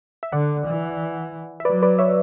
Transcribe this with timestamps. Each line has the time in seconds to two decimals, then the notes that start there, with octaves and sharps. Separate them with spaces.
0.23 E5
0.32 D3 D5 F#5
0.66 E3
1.60 E5
1.65 F#3 B4 D5
1.82 B4 D5
1.99 C#5 E5